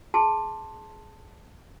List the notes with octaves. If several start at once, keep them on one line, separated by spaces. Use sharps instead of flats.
G#4 A5 C6